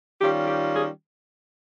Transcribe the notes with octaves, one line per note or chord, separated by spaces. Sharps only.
D#3 G3 C#4 F4 G4
G4
G#4